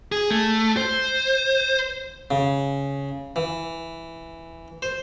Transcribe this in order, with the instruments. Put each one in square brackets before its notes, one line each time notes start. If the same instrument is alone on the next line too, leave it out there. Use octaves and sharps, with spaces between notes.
[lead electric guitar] G#4
A3
C5
[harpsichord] C#3
E3
C5